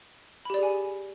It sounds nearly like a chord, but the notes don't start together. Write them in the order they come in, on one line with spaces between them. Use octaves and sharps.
B5 G4 D5 G#4 G#5